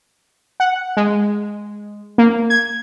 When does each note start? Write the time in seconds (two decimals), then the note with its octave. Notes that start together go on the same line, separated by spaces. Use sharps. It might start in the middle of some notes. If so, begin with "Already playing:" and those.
0.60 F#5
0.97 G#3
2.18 A#3
2.50 G#6